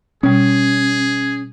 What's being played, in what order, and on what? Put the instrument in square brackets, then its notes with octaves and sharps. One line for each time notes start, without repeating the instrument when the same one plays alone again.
[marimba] B2 G3 [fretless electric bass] C#4 [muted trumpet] G#4